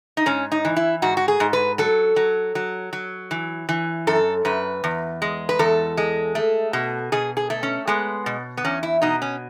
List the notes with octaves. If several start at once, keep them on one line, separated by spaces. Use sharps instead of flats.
D#4
G#2 C#4
D#4
E3
E4
G#2 F#4
F#4
G#4
G#2
B4
F#3 A4
F#3
F#3
F#3
E3
E3
F#2 A4
F#2 B4
E2
G#3
B4
E2 A4
G#3
A3
B2
B2 G#4
G#4
A3
C#4
G#3 B3
B2
B3
E2 C#4
E4
B2 D#4
C#4